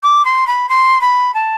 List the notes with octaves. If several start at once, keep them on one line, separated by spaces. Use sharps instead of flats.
D6
C6
B5
C6
B5
A5